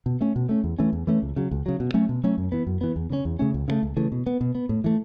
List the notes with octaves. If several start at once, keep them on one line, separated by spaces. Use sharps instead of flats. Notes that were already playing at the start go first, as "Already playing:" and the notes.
B2
A3 C#4
B2
A3 C#4
E2
E3 A3 C#4
E2
E3 A3 C#4
C#2
C#3 F#3
C#2
C#3 F#3
B2
F#3 A3 C#4
B2
F#3 A3 C#4
F#2
E3 B3
F#2
E3 B3
E2
C#3 A3 C#4
E2
C#3 A3 C#4
C#2
C#3 E3 A3
C#2
C#3 E3 A3
B2
B3
B2
B3
A2
E3 A3